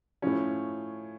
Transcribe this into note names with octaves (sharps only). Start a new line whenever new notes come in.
A2 F3 C#4